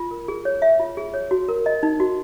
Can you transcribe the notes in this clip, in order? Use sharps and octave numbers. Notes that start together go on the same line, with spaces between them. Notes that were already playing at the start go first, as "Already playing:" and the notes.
Already playing: F4
A#4
G#4
C#5
E5
F4
G#4
C#5
F#4
A#4
D#5
D#4
F#4